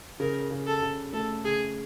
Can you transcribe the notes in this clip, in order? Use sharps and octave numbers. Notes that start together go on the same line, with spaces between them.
C#3 A#4
C#3
A4
C#3
A3 A4
C#3 G#4